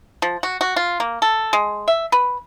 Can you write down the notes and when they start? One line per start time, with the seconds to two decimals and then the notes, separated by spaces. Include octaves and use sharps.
0.22 F3
0.43 F#4
0.61 F#4
0.76 F4
1.00 A#3
1.22 A4
1.53 G#3
1.88 E5
2.12 B4